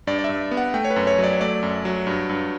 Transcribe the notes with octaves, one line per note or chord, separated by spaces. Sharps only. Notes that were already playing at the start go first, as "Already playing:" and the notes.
G2 D5
D5
G2 E5
B3
F#5
A3 G5
C#5
B4
F#2
C#5
F#3
D5
A3 D5
F#2
F#3
G2
G2